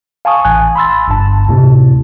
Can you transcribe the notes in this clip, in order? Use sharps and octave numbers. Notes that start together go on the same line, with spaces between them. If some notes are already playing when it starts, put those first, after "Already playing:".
F5 G#5 A5 C#6 D#6
A1 G#5 F#6
B5 C6 E6 A6
G1 G2 A5
D2 A2 C3